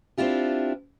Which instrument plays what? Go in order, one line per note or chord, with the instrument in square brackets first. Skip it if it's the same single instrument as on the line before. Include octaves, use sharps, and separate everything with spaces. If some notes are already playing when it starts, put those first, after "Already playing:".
[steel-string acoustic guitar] C4 D4 E4 F4 G4